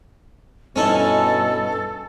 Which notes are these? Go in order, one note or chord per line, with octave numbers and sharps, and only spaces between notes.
G2 B2 C#4 D#4 E4 A4